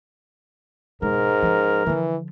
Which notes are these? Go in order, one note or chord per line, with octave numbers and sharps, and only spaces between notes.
E1 G#2 G#3 A#4
F3 C#4
D3 E3 F3